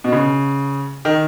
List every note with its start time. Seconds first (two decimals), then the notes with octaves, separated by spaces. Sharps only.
0.04 B2
0.12 C#3
1.05 D#3